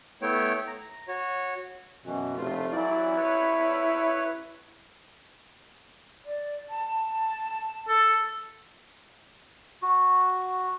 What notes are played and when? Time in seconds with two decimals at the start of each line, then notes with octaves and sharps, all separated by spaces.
0.22 A3 B3 E4 C#5 G5
0.67 A#5
1.08 F#4 C#5
2.05 F#2 B2 E3
2.37 F1 A3 F4
2.72 E3 F#3 E4 D5
3.17 B4 C#5
6.26 D5
6.69 A5
7.88 A4
9.82 F#4